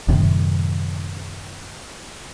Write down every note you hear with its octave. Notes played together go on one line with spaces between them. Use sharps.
F#2 A2 C3 D#3